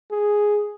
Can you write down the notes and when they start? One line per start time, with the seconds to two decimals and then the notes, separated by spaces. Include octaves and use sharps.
0.12 G#4